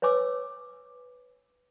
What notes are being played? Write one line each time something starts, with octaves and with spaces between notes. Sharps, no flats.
B4 C#5 G#5 D6 E6